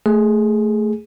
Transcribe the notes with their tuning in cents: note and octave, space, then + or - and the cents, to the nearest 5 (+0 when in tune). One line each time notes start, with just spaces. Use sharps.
A3 +0 G#4 +0